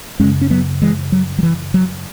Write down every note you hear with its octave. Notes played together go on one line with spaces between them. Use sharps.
F#2 C#3 G#3 C#4
C#4
F#3 B3
E3 G#3
F#3
F#3
E3
F#3